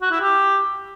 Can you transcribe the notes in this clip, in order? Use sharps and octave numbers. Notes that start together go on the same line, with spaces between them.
F#4
E4
G4